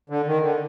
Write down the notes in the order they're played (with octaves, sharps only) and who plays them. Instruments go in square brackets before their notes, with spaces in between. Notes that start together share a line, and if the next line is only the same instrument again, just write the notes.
[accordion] D3
D#3
D3